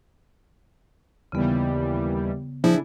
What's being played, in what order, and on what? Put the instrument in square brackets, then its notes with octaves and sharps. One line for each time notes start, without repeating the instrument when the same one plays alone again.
[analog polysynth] D#2 E3 G3 [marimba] C#3 B3
[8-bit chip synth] F3 [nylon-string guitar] D4 E4 G#4